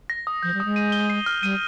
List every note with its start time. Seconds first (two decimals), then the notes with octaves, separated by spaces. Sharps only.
0.10 A#6
0.27 D#6
0.43 F3 G6
0.54 G3
0.60 G#3 D#6
0.76 D#7
0.92 G7
1.10 C7
1.26 F6
1.42 G3 D#7